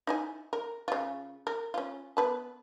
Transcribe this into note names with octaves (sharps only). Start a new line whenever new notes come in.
D#4 E4 G#5
A#4
C#3 F4
A#4
C#4 F4
B3 B4 A5